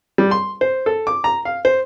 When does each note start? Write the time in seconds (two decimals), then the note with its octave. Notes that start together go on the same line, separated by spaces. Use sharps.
0.18 G3
0.31 C6
0.61 C5
0.86 A4
1.07 D6
1.24 A#5
1.45 F5
1.65 C5